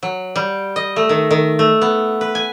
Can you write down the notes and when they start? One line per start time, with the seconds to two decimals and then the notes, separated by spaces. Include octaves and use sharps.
0.03 F#3
0.36 G3
0.76 D#5
0.96 A3
1.09 D#3
1.31 D#3
1.59 A3
1.82 B3
2.21 B4
2.35 G#5